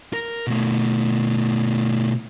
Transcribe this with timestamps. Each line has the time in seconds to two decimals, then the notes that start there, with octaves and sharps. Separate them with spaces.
0.13 A#4
0.47 B2 A3